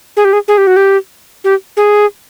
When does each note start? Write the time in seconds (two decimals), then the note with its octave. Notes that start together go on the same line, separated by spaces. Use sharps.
0.17 G#4
0.25 G4
0.33 G#4
0.48 G#4
0.58 G4
0.67 F#4
0.76 G4
1.44 G4
1.77 G#4